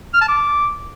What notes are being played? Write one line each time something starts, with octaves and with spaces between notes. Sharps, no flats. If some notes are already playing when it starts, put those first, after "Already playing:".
F6
A5
D6